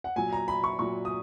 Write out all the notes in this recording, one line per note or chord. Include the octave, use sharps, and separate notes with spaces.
F#5
A#2 F#3 G#5
A#5
B5
C#6
A#2 F#3 C#6
D#6